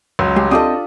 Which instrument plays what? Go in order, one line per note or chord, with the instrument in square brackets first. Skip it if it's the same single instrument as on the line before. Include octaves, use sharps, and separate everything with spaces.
[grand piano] C#2 F#3
[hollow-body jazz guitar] G#3 [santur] G4
[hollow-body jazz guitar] C4 G4 D#5 [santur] D4 F4 A4 [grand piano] D#6